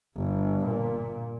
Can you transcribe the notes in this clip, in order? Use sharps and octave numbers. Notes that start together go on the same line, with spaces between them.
G1
A#2